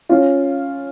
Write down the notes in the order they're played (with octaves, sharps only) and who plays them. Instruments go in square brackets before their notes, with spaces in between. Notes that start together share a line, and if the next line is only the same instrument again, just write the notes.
[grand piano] C#4 F4